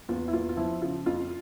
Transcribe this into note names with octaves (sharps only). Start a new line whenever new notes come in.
E2 F4
E4
E2 F4
F4
F3 E4
C#3 F4
F2 F4